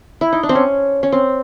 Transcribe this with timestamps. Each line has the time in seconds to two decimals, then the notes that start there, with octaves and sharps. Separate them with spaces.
0.21 E4
0.32 D#4
0.43 D4
0.49 C4
0.55 C#4
1.03 C#4
1.12 C4